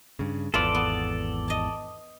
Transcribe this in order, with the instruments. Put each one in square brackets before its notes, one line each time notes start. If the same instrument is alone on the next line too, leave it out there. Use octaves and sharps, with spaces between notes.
[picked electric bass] G2 C#3
[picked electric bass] G#1 E2 [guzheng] F4 B4 [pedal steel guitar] A4 D5
[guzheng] B3
D#5 A5